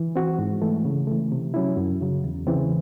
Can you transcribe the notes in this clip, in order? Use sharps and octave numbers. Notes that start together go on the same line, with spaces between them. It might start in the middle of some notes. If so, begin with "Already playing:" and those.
Already playing: E3
C4 F#4
G#2
E3 A3
C#3
E3 A3
C3
F#3 C#4 E4
F#2
C#3 F#3
E2
C#3 E3 C4